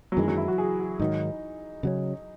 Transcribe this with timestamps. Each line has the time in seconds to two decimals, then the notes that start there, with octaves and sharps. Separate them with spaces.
0.12 F#3
0.16 F#2 D#3 E3 G#3
0.28 F#3
0.37 E4
0.48 F#4
0.58 G#4
0.79 F#4
1.00 G#2 D#3 F#3 D#4
1.83 C#3 F#3 C#4